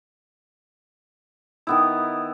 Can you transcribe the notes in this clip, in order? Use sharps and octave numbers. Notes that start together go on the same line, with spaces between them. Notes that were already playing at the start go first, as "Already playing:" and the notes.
D#3 B3 E4